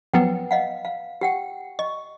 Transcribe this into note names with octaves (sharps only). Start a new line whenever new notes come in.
F3 F#3 B3 B4 F#5 G5
D#5 F5 F#5
F5
G4 F#5 G5
D#5 C#6